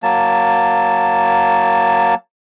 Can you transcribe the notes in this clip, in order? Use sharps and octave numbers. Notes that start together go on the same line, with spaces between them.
F#3 A#3 A5